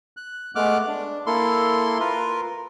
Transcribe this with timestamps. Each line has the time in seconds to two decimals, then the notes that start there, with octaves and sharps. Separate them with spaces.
0.17 F#6
0.55 G#3 A3 B3 D6 F6 F#6
0.88 D4
1.26 A#3 E4 A4 C6
2.00 F4 A#4 B4